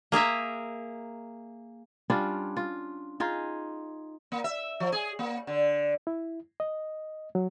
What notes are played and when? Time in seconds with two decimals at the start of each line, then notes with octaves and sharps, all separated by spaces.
0.12 A#3 G#4 A#4 E5
2.10 G3 C#4 D4 F4
2.57 F4
3.20 D#4 F4 G#4
4.32 A#3
4.44 E5
4.80 F3
4.92 G#4
5.19 A#3
5.47 D3
6.07 E4
6.60 D#5
7.35 F#3